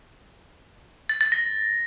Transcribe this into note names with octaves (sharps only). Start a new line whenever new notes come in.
A6
A6
A#6